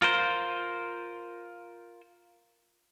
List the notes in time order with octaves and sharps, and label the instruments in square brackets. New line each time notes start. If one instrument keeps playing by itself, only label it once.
[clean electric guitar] F4 A#4 C5